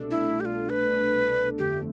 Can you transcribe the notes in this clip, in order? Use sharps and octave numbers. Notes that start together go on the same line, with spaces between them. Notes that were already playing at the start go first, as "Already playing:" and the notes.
Already playing: C2 B2 A3 D4 A4
E4
G4
F4
B4
G1 F2 D3 A3 G4